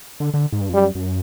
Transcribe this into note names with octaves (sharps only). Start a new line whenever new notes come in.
D3
D3
G#2
G2
F2
F#2 G3
F#2